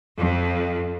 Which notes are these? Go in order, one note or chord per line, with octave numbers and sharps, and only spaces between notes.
F2